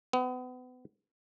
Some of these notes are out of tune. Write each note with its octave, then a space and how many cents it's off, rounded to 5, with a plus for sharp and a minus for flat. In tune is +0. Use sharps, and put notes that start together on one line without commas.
B3 +35